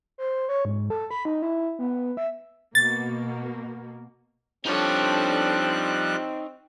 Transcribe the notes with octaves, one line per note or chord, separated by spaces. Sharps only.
C5
C#5
G#2
A4
B5
D#4
E4
B3
E5
B2 A#3 A6
F3 G3 C4 D4 D#4 A4 C#5 F#6